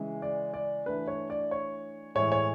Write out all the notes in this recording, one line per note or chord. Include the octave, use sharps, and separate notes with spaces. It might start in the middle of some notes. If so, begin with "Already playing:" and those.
Already playing: C#3 E3 G#3
D5
D5
E3 A3 D4 B4
C#5
D5
C#5
A2 E3 G#3 C#5
C#5